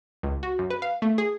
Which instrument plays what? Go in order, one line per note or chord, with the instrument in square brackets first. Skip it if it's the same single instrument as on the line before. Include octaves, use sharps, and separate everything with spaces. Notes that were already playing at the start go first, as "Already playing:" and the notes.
[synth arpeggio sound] C#2
F#4
F#2
B4
F5
A3
G#4